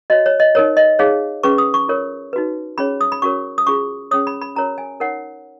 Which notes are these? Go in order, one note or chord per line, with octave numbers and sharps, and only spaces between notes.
F#4 C#5 D#5
C#5
D#5
D#4 A#4 C#5
D#5
D#4 G#4 C#5 F5
C#4 G#4 B4 C#6
D#6
C#6
F4 A#4 C#5
D#4 F#4 B4
C#4 G#4 C#5 B5
D#6
B5
C#4 F#4 A#4 C#5 C#6
D#6
C#4 F4 G#4 C#6
C#4 G#4 C#5 D#6
B5
B5
C#4 F#4 A#4 C#5 A#5
G#5
D#4 A#4 C#5 F#5